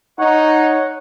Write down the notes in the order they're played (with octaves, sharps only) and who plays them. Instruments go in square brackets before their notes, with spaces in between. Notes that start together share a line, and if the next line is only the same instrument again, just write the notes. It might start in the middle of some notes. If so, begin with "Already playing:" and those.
[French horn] D#4 [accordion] C#5 F#5